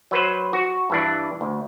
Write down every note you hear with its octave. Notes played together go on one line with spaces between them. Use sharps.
F#3 B4 C5
F#4
G2 E3 D4
D2